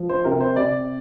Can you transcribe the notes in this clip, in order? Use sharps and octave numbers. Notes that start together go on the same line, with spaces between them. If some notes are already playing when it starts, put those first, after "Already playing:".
Already playing: F3
C5
C3 A#4
C5
C3 D5